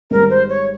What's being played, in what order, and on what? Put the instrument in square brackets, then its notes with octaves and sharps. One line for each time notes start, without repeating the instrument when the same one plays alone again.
[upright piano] G#1 G#2 G3 [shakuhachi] A#4
[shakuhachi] C5
C#5